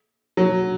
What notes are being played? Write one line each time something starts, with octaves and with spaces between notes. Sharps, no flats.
F#3